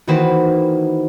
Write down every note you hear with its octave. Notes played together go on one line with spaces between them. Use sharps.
D#3 E3 A#3 F#4 B4 C5